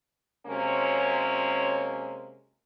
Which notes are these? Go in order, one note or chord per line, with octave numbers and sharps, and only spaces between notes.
C3 F#3 G#3 A#3 C#4